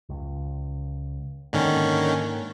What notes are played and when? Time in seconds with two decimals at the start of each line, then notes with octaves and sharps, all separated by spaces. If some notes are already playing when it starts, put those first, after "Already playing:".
0.09 C#2
1.53 G#2 D3 D#3 G#3 A#3 C#4